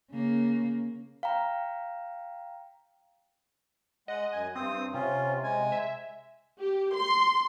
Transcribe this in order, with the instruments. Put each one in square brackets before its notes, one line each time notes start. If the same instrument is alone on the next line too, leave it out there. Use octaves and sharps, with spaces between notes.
[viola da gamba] C#3 A#3
[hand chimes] F5 G5 A#5
[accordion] G#3 F#5 [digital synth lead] D#5
[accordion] F#2 G#5
[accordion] G2 D#6 [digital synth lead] C4
[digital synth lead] C3 [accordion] C#4 F4
[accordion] G#3 G#5
[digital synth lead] E5
[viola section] G4
C6